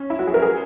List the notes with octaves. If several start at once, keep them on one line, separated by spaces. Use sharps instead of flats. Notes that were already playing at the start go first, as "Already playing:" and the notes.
Already playing: C#4
E4
F#4
G#4
A#4
G#4